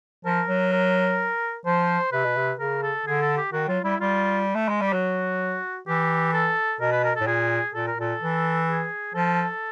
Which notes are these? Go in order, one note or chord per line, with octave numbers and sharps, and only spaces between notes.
F3 A#4
F#3
A#4
F3 C5
C3 B4
B2
C3
C#3 A#4
A4
D3 G#4
A4
G4
D#3 F#4
F#3 F4
G3 E4
G3 F4
A3
G#3
G3
G4
F#3 F#4
E3 G4
A4
B2 A#4
B4
A#4
A2 A4
A#2 G#4
A#2 A4
A#4
A#2 A4
E3
G#4
F3 A4